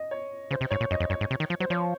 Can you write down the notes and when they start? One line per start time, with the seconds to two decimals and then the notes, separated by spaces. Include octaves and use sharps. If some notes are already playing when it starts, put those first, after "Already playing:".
Already playing: D#5
0.11 C#5
0.51 C#3 C5
0.61 C3
0.71 G#2 C#5
0.80 A#2
0.91 F#2 D#5
1.00 F2
1.10 F#2 C#5
1.21 G#2
1.31 C3
1.40 D#3
1.50 F3
1.60 F#3 C5
1.70 F3 C#5